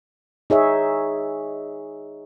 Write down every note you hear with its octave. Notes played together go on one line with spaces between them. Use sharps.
D#4 G#4 C#5 E5